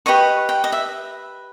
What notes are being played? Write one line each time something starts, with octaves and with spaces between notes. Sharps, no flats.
G4 B4 D#5 C#6
G5
D#5
E5